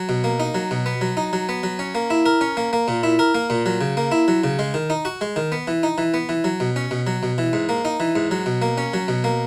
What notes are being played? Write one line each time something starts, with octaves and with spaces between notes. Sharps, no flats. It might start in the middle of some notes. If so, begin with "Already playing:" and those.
Already playing: F#3
B2
A#3
D#4
F#3
B2
B3
F#3
D#4
F#3
B3
F#3
C#4
A#3
E4
A#4
C#4
A#3
A#3
A#2
E4
A#4
A#3
A#2
F#3
C#3
A#3
E4
F#3
C#3
G#3
D#3
D#4
F#4
G#3
D#3
B3
E3
D#4
E3
B3
E3
F#3
B2
C#4
B2
F#3
B2
E3
G#2
A#3
D#4
E3
G#2
F#3
B2
A#3
C#4
F#3
B2
A#3